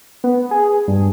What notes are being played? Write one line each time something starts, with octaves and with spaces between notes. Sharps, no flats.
B3
G#4
G2